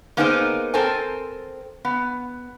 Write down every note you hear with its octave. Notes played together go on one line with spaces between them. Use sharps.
A#3 B3 D#4 G#4 A#4 C5
C4 A4 A#4 C5 G#5
B3